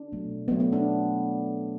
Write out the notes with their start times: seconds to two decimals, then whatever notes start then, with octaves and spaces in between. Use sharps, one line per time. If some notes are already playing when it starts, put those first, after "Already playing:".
Already playing: D4
0.12 B2 F#3 A3
0.48 B2 F#3 A3 B3
0.60 B3
0.73 D4